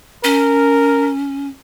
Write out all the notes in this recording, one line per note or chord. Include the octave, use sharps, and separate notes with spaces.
C#4 A#4